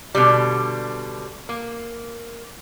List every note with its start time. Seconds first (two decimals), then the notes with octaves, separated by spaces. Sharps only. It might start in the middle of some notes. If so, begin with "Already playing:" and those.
0.15 B2 D3 G3
1.49 A#3